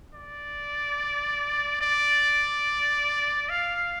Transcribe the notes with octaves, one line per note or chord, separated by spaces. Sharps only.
D5
D5
F5